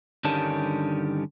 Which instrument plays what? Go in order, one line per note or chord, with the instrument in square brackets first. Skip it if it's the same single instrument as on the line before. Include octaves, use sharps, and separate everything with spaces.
[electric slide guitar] G2 D3 D#3 G3 C#4 A5